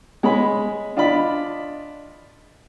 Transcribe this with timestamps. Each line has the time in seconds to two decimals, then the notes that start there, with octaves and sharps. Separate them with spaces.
0.23 G#3 G#4 C#5 B5
0.97 D4 F4 D5 D#5 B5